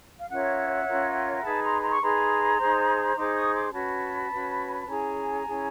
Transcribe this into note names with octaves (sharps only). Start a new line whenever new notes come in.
F5
C#4 F4 A#4 C#5 E5 F#5
C#4 F4 A#4 C#5
D#4 G#4 B4 A5 B5
A#5 C6
A#5 C6
C#6
D#4 G#4 B4 A#5 C6
D#4 G#4 C5
D#4 G#4 C5 C6 D6
C#6 D#6
C6 D6
C#4 F#4 B4 A5 B5
C#4 F#4 B4
C#4 E4 G#4 G#5 A#5
C#4 E4 G#4